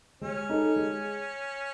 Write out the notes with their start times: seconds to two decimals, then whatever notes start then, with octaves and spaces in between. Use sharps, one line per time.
0.21 G#3 C#4
0.49 D#4 A4
0.76 G#3